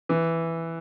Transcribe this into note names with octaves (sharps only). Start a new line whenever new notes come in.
E3